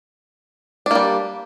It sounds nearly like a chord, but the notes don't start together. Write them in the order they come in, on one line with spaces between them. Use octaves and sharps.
D4 A#3 G3